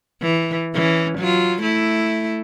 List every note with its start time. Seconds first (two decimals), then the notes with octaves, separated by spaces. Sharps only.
0.22 E3
0.74 E3 C#4
1.18 F#3 F4
1.62 A3 E4